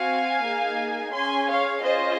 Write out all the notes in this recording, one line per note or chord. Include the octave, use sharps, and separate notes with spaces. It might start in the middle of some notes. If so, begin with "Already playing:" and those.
Already playing: C4 F#4 F5 G#5
A#3 D#4 G#4
C#4 G#4 G#5 C6
C#5 F5
C#4 F4 G#4 C5 D#5